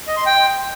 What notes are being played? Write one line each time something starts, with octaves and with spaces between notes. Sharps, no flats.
D#5
C6
G5